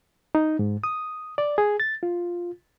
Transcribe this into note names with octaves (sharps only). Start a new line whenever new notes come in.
D#4
G#2
D#6
D5
G#4
A6
F4